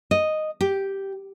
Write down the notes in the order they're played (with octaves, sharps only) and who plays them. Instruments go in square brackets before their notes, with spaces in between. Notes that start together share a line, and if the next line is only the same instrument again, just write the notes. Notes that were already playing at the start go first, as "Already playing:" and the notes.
[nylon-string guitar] D#5
G4